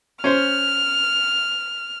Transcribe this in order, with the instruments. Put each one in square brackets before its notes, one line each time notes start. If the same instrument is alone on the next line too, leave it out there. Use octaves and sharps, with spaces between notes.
[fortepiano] C#4 C5 [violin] F6